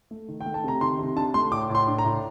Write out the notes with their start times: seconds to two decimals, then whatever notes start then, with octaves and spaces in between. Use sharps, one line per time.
0.11 A3
0.28 D#3
0.41 G5
0.46 A3
0.54 A5
0.64 C3 A#5
0.81 D#3 C6
0.99 C3
1.16 D4 A5
1.34 A3 C6
1.52 A2 D6
1.70 A2
1.75 C6
1.87 D4
1.98 A#5
2.05 A2